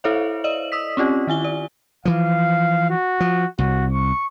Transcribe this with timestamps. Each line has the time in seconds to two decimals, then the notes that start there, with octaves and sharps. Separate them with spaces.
0.04 E4 A4 C5 C#5 E5 F5
0.44 D5 D#5 F#7
0.72 D#6 E6 B6
0.97 C4 C#4 F4 G4
1.27 D#3 E4 G#5 G7
1.44 D5
2.05 E3 F3 F5
2.90 F#4
3.20 F3
3.58 C2 F#4
3.90 C#6